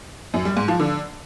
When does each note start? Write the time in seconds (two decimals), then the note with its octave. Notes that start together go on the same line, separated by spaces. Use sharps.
0.34 F#2
0.45 G3
0.57 G#2
0.68 F3
0.80 D3